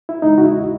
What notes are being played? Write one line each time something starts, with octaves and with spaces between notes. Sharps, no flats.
E4
E2 C#3 G#3 D#4
F#4
E4